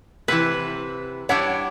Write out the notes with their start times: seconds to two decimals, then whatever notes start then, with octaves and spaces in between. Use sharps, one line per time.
0.28 C3 E3 B4 E5 F#5
1.29 G3 D4 E4 C#5 F#5